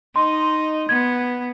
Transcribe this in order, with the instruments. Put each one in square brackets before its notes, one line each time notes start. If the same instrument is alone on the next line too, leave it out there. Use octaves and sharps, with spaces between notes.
[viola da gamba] D#4 D#5 [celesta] C6
[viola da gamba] B3 [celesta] G#6